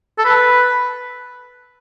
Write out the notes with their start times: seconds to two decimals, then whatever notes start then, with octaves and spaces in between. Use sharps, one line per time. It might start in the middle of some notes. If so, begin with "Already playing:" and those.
0.18 A4
0.25 B4